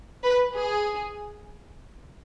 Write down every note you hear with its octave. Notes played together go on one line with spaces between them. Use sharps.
B4
G#4